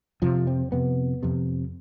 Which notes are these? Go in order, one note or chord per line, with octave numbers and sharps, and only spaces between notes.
F2 C3 F3
C4
F2 C3 B3
F2 C3